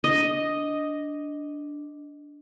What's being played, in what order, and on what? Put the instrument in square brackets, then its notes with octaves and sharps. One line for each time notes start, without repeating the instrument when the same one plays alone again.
[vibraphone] D4 [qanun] D#5